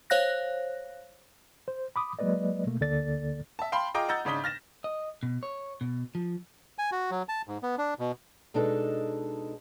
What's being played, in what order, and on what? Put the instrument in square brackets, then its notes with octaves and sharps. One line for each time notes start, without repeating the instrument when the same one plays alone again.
[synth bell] C5 C#5 F5 F#6 A#6
[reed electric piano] C5
B5 D6 D#6
F#3 G#3 A#3 B4 D5 D#5
B2 A3 A#3
D2 D3 A#3 A4 D5 A6
[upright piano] E5 A5
F5 G5 A5 B5 C6
F4 G#4 D#5 G5 A#5 D6
D#5 F#5 A#5 E6 G6 A6
G#2 C#3 D4 D#6 B6 G7
F6 A6 A#6 E7
[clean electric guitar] D#5
B2
C#5
B2
F3
[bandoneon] G#5
F#4
F#3
A5
G#2
B3
D4
B2
[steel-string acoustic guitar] B2 G#3 D4 D#4 A4